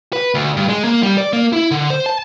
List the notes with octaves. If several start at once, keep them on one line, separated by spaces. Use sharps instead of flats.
B4
D2
G2
G#3
A#3
G3
D5
A#3
E4
D3
C5
A5